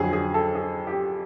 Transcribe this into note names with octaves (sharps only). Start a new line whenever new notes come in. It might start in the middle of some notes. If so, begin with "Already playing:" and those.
Already playing: F2 D3 F#3 G#4
G#4
A4
G#4
G4